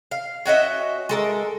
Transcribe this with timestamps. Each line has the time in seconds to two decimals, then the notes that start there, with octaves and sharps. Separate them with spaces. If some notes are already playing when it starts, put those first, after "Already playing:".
0.11 F5
0.46 C#4 F#4 D#5 E5
1.09 G#3 A4 A#4